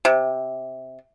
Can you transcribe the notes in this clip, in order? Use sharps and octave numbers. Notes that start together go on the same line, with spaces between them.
C3